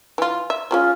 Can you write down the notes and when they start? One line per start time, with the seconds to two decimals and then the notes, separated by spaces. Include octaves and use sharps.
0.18 E3 F4
0.50 E5
0.71 F3 G#3 C#4 F4